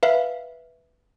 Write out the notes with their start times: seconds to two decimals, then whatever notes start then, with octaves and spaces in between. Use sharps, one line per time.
0.03 B4 E5 F5